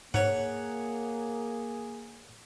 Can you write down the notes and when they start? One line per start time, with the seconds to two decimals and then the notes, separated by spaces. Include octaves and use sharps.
0.14 G#2 A#3 G#4 C#5 F#5